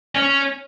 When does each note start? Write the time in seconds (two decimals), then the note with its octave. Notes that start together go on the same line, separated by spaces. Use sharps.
0.15 C#4